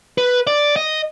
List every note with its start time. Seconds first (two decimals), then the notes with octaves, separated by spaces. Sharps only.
0.18 B4
0.47 D5
0.76 D#5